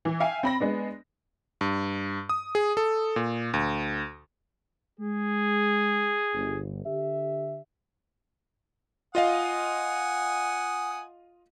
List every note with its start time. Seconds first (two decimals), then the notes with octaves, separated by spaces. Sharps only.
0.05 E3
0.20 E5 F5 G5 G#5
0.43 C4 B5 A#6
0.60 G#3 B3 D4
1.61 G2
2.29 D#6
2.55 G#4
2.77 A4
3.16 A#2
3.54 D2
5.00 G#3 G#4
6.33 G1
6.85 D3 G4 E5
9.15 F4 D#5 F5 F#5 G#5 D#6